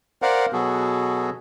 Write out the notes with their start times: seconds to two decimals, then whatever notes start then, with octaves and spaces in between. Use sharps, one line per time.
0.22 A#4 C5 D5 F5 F#5
0.53 B2 F#3 B3 F#4 G#4 A4